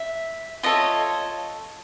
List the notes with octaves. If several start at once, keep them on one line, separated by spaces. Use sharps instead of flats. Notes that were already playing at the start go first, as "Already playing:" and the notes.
Already playing: E5
F4 A4 C#5 D#5